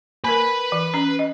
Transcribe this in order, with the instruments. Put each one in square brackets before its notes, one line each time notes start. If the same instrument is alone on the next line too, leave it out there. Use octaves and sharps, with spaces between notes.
[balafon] A#3 A#4 [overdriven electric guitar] B4 B5
[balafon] E3
C#4 A#5
D#5